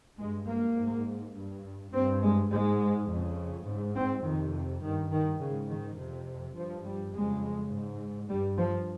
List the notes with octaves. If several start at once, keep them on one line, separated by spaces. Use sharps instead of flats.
G2 G#3
A#3
G#2
G2
G2 C4
G#3
G#2 G#3
F2 C#3
G#2
C4
F2 C3 D#3
G2 D#3
D#3
G#2 C#3
D#3
F2 C3
G2 F3
G3
F2 C#3 G#3
G#2
G2 G3
F3